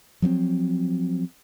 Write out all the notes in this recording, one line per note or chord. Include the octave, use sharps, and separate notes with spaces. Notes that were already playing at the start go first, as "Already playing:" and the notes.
F3 F#3 A#3 C4